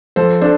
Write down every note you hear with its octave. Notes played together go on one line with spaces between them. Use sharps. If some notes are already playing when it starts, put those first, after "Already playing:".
F3 A4 C5
D4 A4 C5